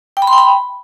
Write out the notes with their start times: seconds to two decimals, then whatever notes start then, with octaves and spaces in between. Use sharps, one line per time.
0.17 G5
0.22 B5
0.27 C6
0.33 G5
0.38 B5